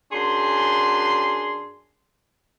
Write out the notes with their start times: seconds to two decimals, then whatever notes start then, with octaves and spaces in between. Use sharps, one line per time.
0.12 F#2 D4 G#4 C6